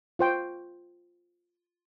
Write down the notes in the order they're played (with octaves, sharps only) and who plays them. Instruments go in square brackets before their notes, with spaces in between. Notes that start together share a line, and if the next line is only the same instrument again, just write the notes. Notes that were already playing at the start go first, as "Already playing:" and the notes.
[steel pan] F4 C5 G5